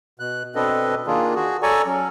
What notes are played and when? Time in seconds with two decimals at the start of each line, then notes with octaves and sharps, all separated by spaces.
0.20 B2 F#6
0.55 B2 C4 D4 A4 B4 D#5
1.07 D#3 A#3 D4 F4 G#4
1.35 F#4 G#4
1.63 A4 C#5 D5 G#5 A#5 C#6
1.86 F#3 C#4